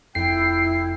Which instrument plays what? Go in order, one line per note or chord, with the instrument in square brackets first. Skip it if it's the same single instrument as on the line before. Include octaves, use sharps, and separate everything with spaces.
[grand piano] F1 [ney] E4 [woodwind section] G5 [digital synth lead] C7